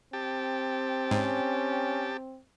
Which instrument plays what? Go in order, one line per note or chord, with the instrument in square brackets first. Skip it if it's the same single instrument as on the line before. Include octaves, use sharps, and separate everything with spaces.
[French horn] C4 [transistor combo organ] G4 A5
[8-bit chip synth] G#2 [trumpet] C#4